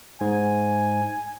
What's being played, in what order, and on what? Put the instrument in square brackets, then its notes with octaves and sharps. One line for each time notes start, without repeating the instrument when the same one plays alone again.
[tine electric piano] G#2 [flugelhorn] G#5